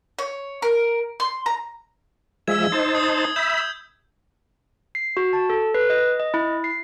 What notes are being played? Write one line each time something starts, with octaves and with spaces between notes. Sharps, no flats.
C#5
A#4
C6
A#5
F3 G#3 E5 E6 G#6
D#4 C5 A5
D#6
E5 B5 G6
C7
F#4
A5
A4
B4
D#5
D#5
E4
C7